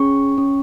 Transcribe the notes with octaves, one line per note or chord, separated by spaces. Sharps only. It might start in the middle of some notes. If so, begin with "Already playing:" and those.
Already playing: C#4 G#4 C#6
C#4